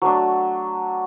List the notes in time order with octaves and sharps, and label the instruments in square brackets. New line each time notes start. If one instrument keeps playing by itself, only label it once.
[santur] F#3 A3 D4